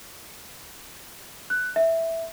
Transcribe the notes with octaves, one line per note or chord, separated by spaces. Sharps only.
F#6
E5